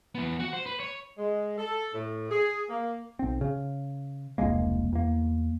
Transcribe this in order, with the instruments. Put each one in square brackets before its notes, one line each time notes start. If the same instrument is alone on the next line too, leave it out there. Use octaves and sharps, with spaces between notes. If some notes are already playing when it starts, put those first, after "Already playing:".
[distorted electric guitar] E3 B3
F#4 F#5
C5
B4
C#5
[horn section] G#3
A4
A2
G#4
A#3
[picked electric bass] B1 C4
C#3
E1 C2 G#3 A#3
E2 A#3